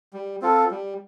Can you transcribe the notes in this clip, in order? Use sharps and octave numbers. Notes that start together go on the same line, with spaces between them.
G3
C4 F4 A4
G3